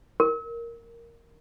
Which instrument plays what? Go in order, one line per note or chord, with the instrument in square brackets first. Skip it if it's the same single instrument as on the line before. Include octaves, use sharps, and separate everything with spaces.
[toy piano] A#4